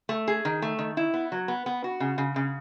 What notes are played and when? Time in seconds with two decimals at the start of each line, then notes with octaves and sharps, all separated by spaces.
0.09 A3
0.28 G#4
0.45 D#3
0.62 A3
0.79 D#3
0.97 E4
1.14 B3
1.32 F#3
1.48 B3
1.66 B3
1.84 F#4
2.00 C#3
2.18 C#3
2.36 C#3